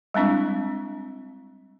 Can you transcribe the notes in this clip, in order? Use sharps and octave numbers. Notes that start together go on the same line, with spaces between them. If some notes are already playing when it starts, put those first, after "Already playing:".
G3 G#3 C4 D4 E4